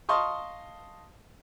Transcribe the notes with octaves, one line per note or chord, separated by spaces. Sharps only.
D#5 F5 A5 C6 C#6 D#6